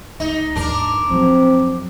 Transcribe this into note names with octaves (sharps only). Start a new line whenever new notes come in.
C#2 D#4
D#2 G#2 D4 A#4
F#2 F3 C4